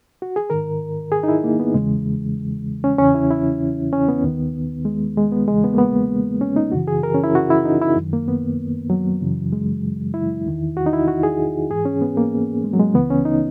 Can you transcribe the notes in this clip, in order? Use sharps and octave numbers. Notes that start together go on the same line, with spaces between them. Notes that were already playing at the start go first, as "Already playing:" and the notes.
F#4
G#4
G#2 D#3 A#4
G#4
D#4
E4
A#3
B3
E2 C#3 E3 G#3
C#4
E2 C#3 E3 C#4
E4
E4
C#4
B3
D#2 D#3
G#3
G#3
B3
E2 C#3 E3 G#3
B3
A#3
B3
C#4
D#4
F#2 C#3 E3 F#4
G#4
A#4
C#4
E4
F#4
E4
D#4
E4
F#2 D#3
A#3
B3
F#3
F#2 C#3 E3
G#3
E4
E2 D#3
F#4
D#4
E4
F#4
G#4
G#2 E3 G#4
C#4
B3
A#3
G#3
F#3
G#3
C#2 C#3 E3 B3
C#4
D#4